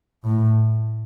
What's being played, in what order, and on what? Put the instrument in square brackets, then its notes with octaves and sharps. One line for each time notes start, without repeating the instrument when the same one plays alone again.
[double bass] A2